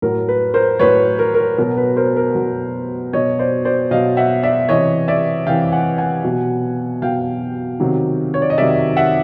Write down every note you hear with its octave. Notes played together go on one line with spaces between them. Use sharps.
A2 F#3 A#4
B4
A#4 C5
A2 F#3 B4 C#5
A#4
A#4
B2 F#3 A#4
B4
A#4 C5
A#4
B2 F#3
B2 F#3 C#5 D#5
C5 D5
C5 D5
B2 F#3 D#5 F5
E5 F#5
D5 E5
C3 E3 C#5 D#5
D5 E5
C3 E3 F5 G5
F#5 G#5
F#5 G#5
B2 F#3
B2 F#3 F5 G5
C3 D#3 F#3
C#5
D5
D#5
C3 D#3 F#3 D5 E5
E5 F#5